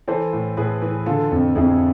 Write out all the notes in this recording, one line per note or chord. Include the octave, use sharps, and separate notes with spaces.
E3 A4 C5
A2
A2 G#4 B4
E3
D3 F4 A4
F2
F2 E4 G#4